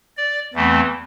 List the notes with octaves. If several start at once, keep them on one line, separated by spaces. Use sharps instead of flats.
D5
E2 E3 A3 C4